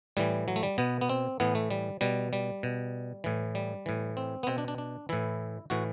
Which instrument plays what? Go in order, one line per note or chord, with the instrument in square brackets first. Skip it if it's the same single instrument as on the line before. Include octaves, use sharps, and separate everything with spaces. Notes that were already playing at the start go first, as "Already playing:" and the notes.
[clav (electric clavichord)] A2 E3 G3
F#3
A3
G3
B2 B3
B3
C4
A2 E3 B3
A3
G3
B2 G3
G3
B2
A2 E3
G3
A2 E3
C4
B3
B2 C4
D4
D4
D4
A2 E3 E4
A2 E3 F#4